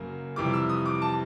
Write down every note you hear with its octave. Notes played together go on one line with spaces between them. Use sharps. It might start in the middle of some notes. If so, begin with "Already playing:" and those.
Already playing: F#2 C#3 F#3 A#3
F2 C3 E3 G3 D6
E6
D#6
D6
A5